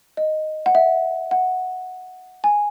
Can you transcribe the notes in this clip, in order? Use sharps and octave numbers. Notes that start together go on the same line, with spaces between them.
D#5
F#5
E5
F#5
G#5